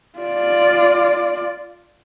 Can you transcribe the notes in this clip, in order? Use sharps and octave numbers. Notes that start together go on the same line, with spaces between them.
F4 D5